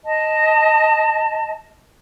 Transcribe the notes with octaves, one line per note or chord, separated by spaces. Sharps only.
D#5 A5